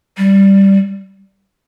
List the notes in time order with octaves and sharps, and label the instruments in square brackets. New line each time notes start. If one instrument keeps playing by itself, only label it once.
[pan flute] G3